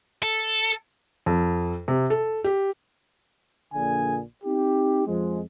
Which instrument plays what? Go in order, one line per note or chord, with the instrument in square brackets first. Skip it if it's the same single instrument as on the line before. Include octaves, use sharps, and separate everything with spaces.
[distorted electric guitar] A4
[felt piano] F2
C3
A4
G4
[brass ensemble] A#1 A#2 D3 G#4 G#5
C4 D#4 G4
F2 F3 G#3